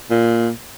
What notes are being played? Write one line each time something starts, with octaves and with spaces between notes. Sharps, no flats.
A#2